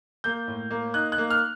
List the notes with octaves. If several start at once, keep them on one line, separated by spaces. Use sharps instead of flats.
A#3 G6
A2
A#3
D#4 F#6
F#6
A#3
F6